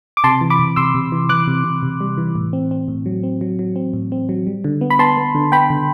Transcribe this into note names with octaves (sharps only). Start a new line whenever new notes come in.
D6
C3 A5 C6
E3
B5 D6
C3
C3 C6 E6
C3
E3
E3 D6 F#6
C3
C3
C3
G3
E3
A2
C4
C4
A2
F#3
C4
F#3
F#3
C4
A2
C4
F#3
G3
D3
B3
B5
B3 A5 C6
B3
D3
B3 G5 B5
D3